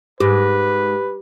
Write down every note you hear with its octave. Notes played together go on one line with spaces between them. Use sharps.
G#2 G4 B4